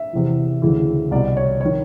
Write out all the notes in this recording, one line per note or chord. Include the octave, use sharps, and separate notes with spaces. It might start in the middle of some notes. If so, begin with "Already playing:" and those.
Already playing: E5
E2 C3 E3
D2 C#3 E3
C2 B2 D5
C#5
D#3 C#5